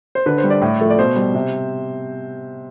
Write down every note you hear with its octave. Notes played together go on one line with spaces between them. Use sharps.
C5
D3 B4
C5
G3
D5
A2
F3 A3
D5
B2 C5
G3
C3